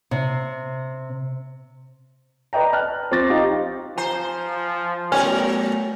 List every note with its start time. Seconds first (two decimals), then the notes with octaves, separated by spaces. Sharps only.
0.11 C3
2.53 B4 D5 D#5 G5 A#5
2.73 A5 F6 F#6
3.11 F3 C4 C#6 D6 A6 A#6
3.30 D#4 G4 F5
3.98 F3 C5 G#5 A#5 G6
5.12 F#3 A3 B3 C#4 A#4 F6